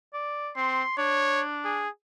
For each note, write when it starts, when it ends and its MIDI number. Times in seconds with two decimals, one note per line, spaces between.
0.14 0.50 74
0.56 0.83 60
0.56 0.94 84
0.98 1.84 62
0.98 1.41 73
1.65 1.89 68